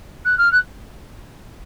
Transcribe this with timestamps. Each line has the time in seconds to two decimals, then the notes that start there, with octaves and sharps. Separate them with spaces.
0.25 F#6
0.38 F6
0.52 F#6